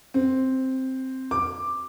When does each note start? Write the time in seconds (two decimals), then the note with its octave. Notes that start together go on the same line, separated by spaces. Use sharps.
0.14 C4
1.31 D6